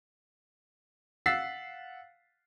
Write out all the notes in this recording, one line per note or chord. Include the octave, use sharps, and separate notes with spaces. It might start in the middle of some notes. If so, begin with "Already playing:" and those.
F5 F#5 E6 A6 B6 C7